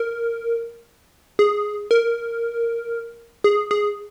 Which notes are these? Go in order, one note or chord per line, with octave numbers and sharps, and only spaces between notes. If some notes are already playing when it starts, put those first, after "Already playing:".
Already playing: A#4
G#4
A#4
G#4
G#4